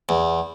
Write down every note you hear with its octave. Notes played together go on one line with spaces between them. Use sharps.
E2